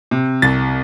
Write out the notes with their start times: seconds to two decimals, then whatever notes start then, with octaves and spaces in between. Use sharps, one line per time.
0.11 C3
0.42 C2 A6